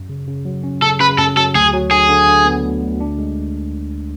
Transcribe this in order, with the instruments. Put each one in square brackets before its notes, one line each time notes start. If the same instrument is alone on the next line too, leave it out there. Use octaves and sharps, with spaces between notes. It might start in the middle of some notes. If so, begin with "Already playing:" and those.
Already playing: [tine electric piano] F#2
C#3
C#3
F#3
C#4
[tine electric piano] C#3 [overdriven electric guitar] A4
[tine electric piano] C#3 [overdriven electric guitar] B4
[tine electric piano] F#2 [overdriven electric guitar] A4
[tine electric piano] F#3 [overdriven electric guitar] A4
[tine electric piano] D2 [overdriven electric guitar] G#4
[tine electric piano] F#3
[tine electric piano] D3 [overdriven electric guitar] G#4
[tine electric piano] D3
D3
B3
D2
D2
D4
G#3